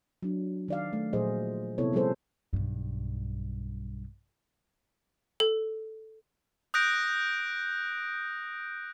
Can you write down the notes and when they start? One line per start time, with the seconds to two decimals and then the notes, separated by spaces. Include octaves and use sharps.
0.23 F#3 D4
0.68 D#3 D5 F5
0.93 A3
1.13 A#2 F3 F#3 G#4 C5 D#5
1.78 C3 D#3 B3 E4 A4 C#5
1.93 F3 G3 G#4 A4 C5
2.53 B1 G2
5.40 A4
6.74 D#6 F#6 G6 A#6 D7